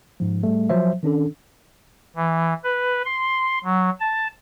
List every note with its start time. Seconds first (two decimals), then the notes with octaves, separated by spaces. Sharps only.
0.20 G#2 F3
0.43 A2 G3 A3
0.70 F3 F#3 C5 E5
1.03 D#3 C#4 D4 A4
2.16 E3
2.64 B4
3.05 C6
3.64 F#3
4.00 A5